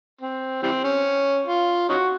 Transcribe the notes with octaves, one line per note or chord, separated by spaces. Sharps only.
C4
E3 G3 C4
C#4
F4
C#4 D#4 F#4